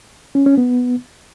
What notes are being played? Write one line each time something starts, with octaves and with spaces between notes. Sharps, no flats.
C#4
C#4
B3